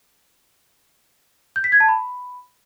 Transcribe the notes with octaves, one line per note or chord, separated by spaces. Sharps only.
G6
B6
G#6
A5
B5